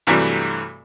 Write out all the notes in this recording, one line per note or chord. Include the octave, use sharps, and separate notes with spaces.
G2 C3 E3 F#3 G3 A3